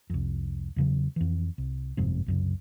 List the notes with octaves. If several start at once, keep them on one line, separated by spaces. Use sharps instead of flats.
C2 F2
E2 C#3 F#3
F2 E3
C2
G1 F2 G#2 C3
C2 F#2 C#3